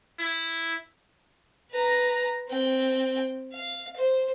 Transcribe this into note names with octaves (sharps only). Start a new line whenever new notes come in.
E4
B4 A#5
C4 G5
F5
C5